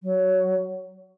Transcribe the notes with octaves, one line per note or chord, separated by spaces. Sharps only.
F#3